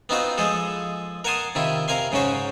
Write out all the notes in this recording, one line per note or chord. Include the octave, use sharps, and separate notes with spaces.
B3 C4 D#4 F4 F#4 C5
F3 G#3 G#4 A4
A#4 F#5 G#5 A5 C6 D#6
C3 D#3 E4 F4
C3 A#4 F5 G#5 C6
G#2 C#3 F#3 C#4 F#4 C5